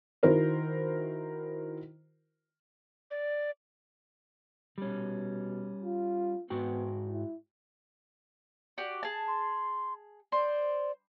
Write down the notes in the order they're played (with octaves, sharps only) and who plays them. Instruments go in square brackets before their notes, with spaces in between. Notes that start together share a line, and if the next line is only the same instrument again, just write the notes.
[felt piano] D#3 E4 F#4 A#4 C5
[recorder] D5
[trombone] B2 [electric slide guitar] G3 C#4
[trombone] F4
[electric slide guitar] G#2 F#4 G5 [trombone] B3
[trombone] E4
[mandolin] F#4 G4 D5
G#4 A5
[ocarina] C6
[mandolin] C5 [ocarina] D5